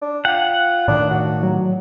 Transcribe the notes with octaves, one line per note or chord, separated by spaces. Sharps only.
D4
F4 F#5 G5
A2 D#3 D4
F#4
F#3